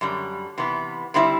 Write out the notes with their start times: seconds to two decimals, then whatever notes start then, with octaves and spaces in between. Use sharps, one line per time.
0.01 F#2 D3 G3
0.58 C3 E3 B3
1.14 D3 G3 C4 E4